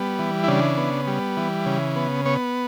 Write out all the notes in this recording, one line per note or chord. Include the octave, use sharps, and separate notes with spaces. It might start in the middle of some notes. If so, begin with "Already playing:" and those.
Already playing: G3 B3
E3
E4
C#3 D4
B3
G3
E3
C#3
B3
B3 C#5